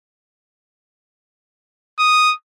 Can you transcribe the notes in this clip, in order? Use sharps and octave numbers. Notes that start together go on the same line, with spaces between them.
D#6